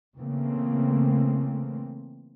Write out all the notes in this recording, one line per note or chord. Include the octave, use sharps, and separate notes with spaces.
C#3 E3 A3 A#3 C4